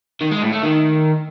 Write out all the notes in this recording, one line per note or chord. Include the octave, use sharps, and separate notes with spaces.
D#3
G#3
A2
A3
D#3